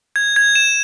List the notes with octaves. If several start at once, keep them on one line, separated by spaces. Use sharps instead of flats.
G#6
G#6
E7